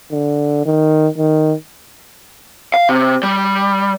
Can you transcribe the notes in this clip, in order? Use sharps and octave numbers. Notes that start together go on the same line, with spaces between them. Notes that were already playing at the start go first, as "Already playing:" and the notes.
D3
D#3
D#3
F5
C3
G3